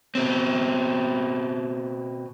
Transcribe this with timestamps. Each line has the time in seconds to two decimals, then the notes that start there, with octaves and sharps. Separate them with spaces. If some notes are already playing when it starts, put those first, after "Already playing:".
0.15 B2 C4